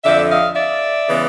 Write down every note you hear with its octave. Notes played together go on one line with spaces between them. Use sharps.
F2 D3 F3 D5 E5
D#5 F5
D5 E5
C#3 E3 G#3 B3